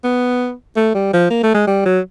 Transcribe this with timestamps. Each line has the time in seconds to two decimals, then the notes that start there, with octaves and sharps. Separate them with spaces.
0.04 B3
0.76 A3
0.94 G3
1.13 F3
1.30 A#3
1.43 A3
1.55 G#3
1.67 G3
1.86 F#3